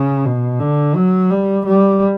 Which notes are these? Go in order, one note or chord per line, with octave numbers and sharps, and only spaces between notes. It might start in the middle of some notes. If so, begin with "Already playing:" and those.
Already playing: C#3
B2
D3
F#3
G3
G3